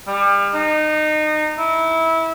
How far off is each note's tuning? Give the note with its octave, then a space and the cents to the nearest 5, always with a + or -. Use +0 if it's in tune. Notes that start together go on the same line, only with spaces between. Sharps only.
G3 +35
D#4 -25
E4 -20